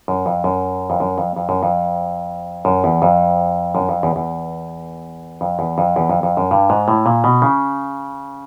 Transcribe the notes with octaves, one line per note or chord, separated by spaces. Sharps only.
F#2
F2
F#2
F2
F#2
F2
F2
F#2
F2
F#2
E2
F2
F#2
F2
E2
E2
F2
E2
F2
E2
F2
F2
F#2
G2
G#2
A2
A#2
B2
C#3